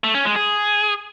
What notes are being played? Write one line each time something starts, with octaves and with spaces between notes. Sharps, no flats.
A3
C#4
G#3
G#4